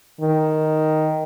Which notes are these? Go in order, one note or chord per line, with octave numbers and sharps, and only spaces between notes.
D#3